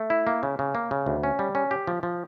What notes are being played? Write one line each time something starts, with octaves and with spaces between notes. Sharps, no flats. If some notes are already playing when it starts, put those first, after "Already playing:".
Already playing: A3
E4
A#3
C#3
C#3
A#3
C#3
D2
C#4
G3
C#4
G4
F3
F3